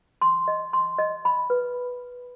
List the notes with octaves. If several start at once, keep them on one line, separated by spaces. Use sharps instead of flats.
C6
D#5
C6
D#5
B5
B4